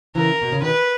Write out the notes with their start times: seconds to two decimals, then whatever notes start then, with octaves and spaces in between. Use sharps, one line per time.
0.15 C#3 E3 A#4
0.42 B2
0.52 C#3
0.62 B2 D#3 B4